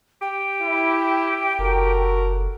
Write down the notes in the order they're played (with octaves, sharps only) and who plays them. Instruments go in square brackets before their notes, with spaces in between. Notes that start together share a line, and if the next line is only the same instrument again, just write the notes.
[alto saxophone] G4 [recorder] G5
[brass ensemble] E4
[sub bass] F#1 [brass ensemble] F#4 A4 A#4